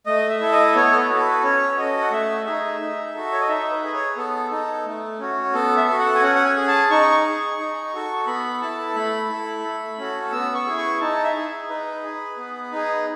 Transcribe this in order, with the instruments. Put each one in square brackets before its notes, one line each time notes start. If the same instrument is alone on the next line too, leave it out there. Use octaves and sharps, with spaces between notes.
[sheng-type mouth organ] A3 D#5
E5
E4 A4
D#5
B3 C#5
A4
B4
F#4 A4
B4
C#4 C#5
F#4 A4 D#5
F#5
A3 E5
D#4 G#4 E5
D#4
F#4 A4
C#5
D#5
D#4 E5
B4
G#4
C#5
B3 A4
D#4 A4
A3
C#4 F#4
B3 A4
E5
F#4 A4
F#5
G#5
C#4 F#5
F#5
G#5
G#4
A5
D#4 C#6
G#4
D#4
F#4 A4
B3 B5
E4 A4 A5
A3 B5
E4 A4
A3
C#4 F#4 A4
B3 E6
C#6
E4 G#4
C#6
D#4 A5
E5
G#4
D#4 B4
G#4
B3
D#4 G#4